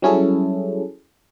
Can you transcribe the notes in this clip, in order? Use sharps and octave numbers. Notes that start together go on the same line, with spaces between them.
F#3 G3 C#4 E4 G#4 A4